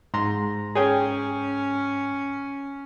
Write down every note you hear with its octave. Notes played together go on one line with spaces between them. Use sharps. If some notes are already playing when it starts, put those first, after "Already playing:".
G#2 A#5 C6
C#4 G#4 C#5 G5